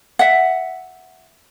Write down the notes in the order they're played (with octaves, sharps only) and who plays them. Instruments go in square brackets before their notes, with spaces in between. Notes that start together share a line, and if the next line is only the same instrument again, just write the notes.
[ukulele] E5 F#5